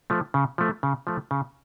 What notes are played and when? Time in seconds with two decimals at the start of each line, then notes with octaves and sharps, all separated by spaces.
0.10 F3 A3
0.34 C#3
0.58 F3 A3
0.83 C#3
1.07 F3 A3
1.31 C#3